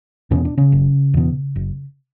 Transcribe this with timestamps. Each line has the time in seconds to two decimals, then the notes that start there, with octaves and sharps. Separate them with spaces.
0.31 E2 B2 C#4
0.45 D4
0.57 C#3 C#4
0.72 F#1
1.14 E2 B2
1.56 F#1